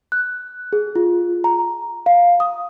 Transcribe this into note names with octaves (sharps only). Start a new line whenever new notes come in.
F#6
G#4
F4
A#5
F5
D#6